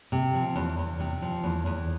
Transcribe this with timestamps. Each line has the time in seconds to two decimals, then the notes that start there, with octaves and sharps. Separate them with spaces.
0.12 C3
0.34 F3
0.56 E2
0.78 E2
1.00 C3
1.22 F3
1.44 E2
1.66 E2